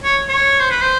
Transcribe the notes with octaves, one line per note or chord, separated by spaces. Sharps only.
C#5
C#5
C5
B4
C5